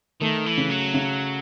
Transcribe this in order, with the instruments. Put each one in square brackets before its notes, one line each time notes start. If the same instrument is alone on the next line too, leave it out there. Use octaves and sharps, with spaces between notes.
[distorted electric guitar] D#3 [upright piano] A3
[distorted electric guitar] E3
[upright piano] C#3
[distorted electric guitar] F#3
[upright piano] C#3